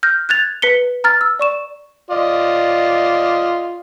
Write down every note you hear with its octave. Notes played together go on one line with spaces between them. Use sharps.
F6 G6 A#6
F#6 G#6 A6 F7
B4 B6 C#7 G7
A#5 F6 A6
E6
D5 C#6 E7
F4 D5 D#5